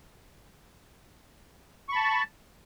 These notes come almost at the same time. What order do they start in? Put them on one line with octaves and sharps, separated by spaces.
C#6 B5 A5